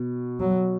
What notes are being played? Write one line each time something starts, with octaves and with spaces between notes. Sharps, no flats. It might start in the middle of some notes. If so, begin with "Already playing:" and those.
Already playing: B2
F#3